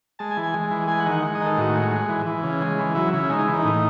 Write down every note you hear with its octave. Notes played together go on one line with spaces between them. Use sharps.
G#3 A5
G#5
E3
G#5
G#3
E3
G#3 G#5
F#5
D#3
F#5
G#3
D#5
D#3
A4
A2 F#4
G#3
G#3
E3
E3
C#3
G#3
E3
F#3 E4
C#3 E4
G#3 D#4
E3
D#4
A2